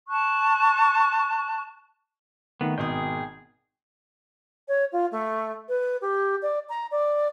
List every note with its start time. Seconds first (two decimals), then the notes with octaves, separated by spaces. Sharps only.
0.09 A5 C#6 F#6
2.61 D#3 A3 B3
2.78 G#1 B2 G#4 G5 D#6
4.68 C#5
4.92 F4
5.11 A3
5.68 B4
6.01 G4
6.42 D5
6.69 A#5
6.91 D5